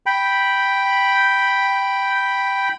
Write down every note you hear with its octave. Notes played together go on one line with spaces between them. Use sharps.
G5 B5